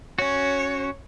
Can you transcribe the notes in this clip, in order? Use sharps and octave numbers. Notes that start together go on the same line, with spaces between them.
C#4 F#4 C#5